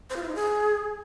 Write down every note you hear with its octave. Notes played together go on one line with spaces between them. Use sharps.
C5
F4
E4
D#4
G#4